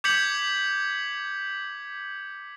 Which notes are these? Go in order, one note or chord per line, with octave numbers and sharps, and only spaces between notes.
D6 G6 G#6 B6 C#7 F#7